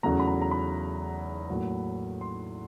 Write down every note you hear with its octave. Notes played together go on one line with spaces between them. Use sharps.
E2 C#3 F#3 A3 A#5
B5
A#5
A#5
B5
A2 F#3 A#3
C6